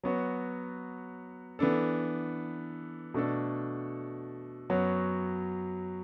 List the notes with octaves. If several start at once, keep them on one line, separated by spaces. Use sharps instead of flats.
F#3 B3 F#4
E3 B3 D4 A4
B2 A3 D4 A4
F#2 F#3 B3 F#4